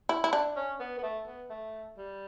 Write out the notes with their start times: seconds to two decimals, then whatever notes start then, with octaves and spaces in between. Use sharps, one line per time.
0.09 E4
0.24 E4
0.33 D4
0.56 C#4
0.80 B3
0.98 B3
1.03 A3
1.27 B3
1.50 A3
1.97 G3